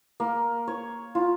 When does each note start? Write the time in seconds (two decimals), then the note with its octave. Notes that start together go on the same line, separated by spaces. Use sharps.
0.20 A#3
0.67 C#5
1.15 F4